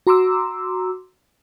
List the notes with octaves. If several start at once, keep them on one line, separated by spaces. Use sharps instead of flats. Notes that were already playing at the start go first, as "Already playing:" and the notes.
F#4 A#5 C6 D6 E6